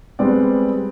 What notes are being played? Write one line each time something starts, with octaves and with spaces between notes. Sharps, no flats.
G3 G#3 B3 C4 D5